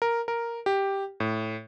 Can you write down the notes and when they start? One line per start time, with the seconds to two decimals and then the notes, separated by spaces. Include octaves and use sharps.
0.02 A#4
0.28 A#4
0.66 G4
1.20 A2